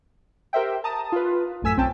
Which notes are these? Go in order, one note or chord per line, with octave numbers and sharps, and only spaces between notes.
G4 A#4 C5 E5 G5
A5 A#5 D#6
F4 B4
A1 F#2 A3 G#5 E6 B6
B1 C4 C#4 G5 A5